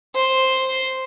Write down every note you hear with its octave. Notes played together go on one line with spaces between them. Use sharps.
C5